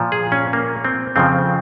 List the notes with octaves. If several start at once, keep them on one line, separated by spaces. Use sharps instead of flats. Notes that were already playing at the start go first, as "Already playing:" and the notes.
Already playing: A#2 F3
G#4
C#4
A#3
C4
F2 C#3 F3 C4